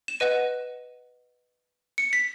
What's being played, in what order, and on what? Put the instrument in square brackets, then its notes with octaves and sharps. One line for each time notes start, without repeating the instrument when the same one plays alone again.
[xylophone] E7
B4 D#5 F#5 D#7
C#7
B6